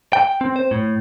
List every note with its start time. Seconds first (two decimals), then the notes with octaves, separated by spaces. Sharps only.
0.13 G5
0.41 C4
0.56 C5
0.71 A2